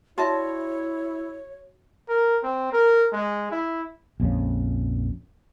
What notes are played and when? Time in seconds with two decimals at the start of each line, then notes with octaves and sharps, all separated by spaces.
0.18 G3 D4 E4 F#4 C#5 E5 A5
2.09 A#4
2.43 C4
2.73 A#4
3.13 G#3
3.51 E4
4.20 A#1 F2 C#3